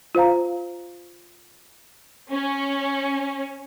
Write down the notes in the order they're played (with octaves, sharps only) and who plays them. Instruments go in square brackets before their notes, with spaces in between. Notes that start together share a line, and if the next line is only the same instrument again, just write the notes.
[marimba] F4 C5 F5 A#5
[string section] C#4